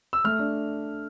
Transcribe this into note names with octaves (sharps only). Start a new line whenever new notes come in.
E6
A3 F6
D4